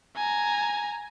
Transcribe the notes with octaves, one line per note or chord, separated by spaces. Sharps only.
G#5 A#5